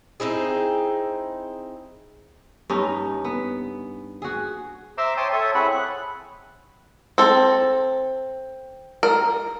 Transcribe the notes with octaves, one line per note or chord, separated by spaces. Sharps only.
C4 D#4 E4 G#4
G2 C#4 D#4
B3
F#4 G#4
C5 E5 A#5 C6 D6 E6
C#5 G5 A5 C6 D6 D#6
A4 C#5 E5 A5 D#6
C4 E4 G#4 C#5 F#5 B5
F#6
C4 A4
A#4